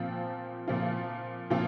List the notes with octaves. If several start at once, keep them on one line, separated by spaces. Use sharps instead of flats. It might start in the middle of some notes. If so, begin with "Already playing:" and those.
Already playing: A#2 F3 C4 F4
A#2 F3 C4 F4
A#2 F3 C4 F4